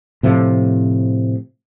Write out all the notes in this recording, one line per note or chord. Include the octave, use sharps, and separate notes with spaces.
A2 C3 F3